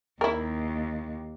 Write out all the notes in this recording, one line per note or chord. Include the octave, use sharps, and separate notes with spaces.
D#2 E4 A#4